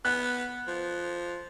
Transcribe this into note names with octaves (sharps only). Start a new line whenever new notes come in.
B3 F#6
F3